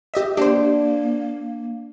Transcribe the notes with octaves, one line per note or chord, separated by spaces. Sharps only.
G4 D#5 E5
A#3 D4 G4 C5